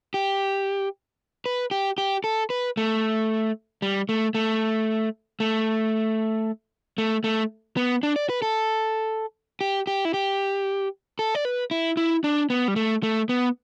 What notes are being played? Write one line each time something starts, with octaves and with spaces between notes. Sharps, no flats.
G4
B4
G4
G4
A4
B4
A3
G3
A3
A3
A3
A3
A3
B3
D4
D5
B4
A4
G4
G4
E4
G4
A4
D5
B4
E4
E4
D4
B3
G3
A3
A3
B3